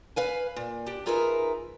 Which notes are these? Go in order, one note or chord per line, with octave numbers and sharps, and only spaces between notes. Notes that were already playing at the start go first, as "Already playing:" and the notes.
B4 F5 G#5
A#2
D4 G4
D#4 F4 G#4 A#4 B4 E5